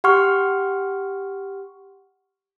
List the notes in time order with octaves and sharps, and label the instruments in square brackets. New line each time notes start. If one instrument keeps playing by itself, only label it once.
[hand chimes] G4 F#5 C6 C#6 F6